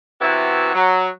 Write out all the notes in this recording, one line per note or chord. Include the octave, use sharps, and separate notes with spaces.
C3 E3 B3 E4 F#4
F#3